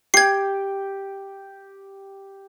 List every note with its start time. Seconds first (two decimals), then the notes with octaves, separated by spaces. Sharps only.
0.14 G4 G5 G#6 C7